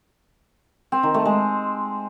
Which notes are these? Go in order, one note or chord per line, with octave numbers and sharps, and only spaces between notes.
C4
D#3
A3
G#3